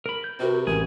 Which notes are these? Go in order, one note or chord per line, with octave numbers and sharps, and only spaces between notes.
A#4 B5
G6
C3 F#4 A#4 B4
A1 G#4 A#4